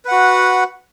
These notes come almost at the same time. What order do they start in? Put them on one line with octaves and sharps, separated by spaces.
B4 F#5 F#4